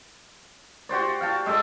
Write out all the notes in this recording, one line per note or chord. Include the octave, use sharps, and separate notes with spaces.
F#4 G4 C5 D5
F5 G5 A5
G#3 G4 A4 D5